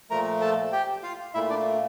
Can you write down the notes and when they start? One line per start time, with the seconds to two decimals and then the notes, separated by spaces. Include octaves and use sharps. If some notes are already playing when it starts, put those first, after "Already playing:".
0.10 A#2 F3 A3 A#4 A#5
0.41 A4 A5
0.72 G4 G5
1.03 F4 F5
1.34 A#2 A3 E4 E5
1.50 D4 D5